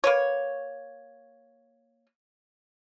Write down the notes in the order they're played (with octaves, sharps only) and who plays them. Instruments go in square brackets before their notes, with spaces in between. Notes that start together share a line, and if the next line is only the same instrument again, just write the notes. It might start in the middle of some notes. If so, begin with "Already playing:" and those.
[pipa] A#3 B4 C#5